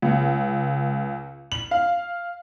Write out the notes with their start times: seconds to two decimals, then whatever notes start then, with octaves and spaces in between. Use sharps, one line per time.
0.02 C#2
1.52 F#7
1.71 F5